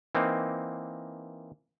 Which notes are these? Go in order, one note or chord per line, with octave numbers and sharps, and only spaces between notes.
E3 A#3 C4 D#4